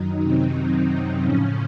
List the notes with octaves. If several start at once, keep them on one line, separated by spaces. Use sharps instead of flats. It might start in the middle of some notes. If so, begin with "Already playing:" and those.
Already playing: F#2 D#3 F#3 D#4
C3 C4
C3 C4
A2 C#3 F3 C#4